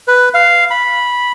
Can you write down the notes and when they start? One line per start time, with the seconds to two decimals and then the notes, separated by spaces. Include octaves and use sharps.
0.08 B4
0.34 F5
0.70 B5